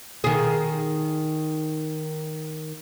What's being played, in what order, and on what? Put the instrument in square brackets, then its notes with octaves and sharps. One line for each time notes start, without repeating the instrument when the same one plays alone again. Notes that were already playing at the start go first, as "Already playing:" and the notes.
[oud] D#3 G#4